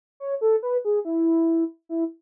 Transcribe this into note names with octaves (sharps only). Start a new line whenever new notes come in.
C#5
A4
B4
G#4
E4
E4